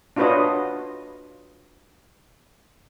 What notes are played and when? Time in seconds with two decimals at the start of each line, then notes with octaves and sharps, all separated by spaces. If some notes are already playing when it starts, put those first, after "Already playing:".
0.16 D4 F4 F#4 B4 C#5 D#5